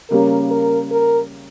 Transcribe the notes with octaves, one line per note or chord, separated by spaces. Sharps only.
C#3 G3 A#3 C#4 A#4
A#4
A#4